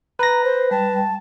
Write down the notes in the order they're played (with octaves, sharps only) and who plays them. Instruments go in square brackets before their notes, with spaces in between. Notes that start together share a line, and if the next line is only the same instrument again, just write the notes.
[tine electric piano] B4 A#6 [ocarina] A#5
[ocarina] C5
[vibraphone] G3 G5 [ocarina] A5